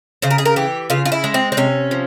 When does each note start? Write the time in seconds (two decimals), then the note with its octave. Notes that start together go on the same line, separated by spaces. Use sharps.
0.22 C#3 C5
0.30 A#4
0.38 G#4
0.45 A#4
0.56 E3 G4
0.90 C#3 F4
1.06 F4
1.12 E4
1.24 G#3
1.34 C4
1.52 C4
1.57 C3 C#4
1.91 F3